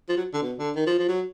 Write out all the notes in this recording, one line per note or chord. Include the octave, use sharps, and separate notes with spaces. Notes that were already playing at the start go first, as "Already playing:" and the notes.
F3
F#3
D3
B2
D3
D#3
F3
F3
F#3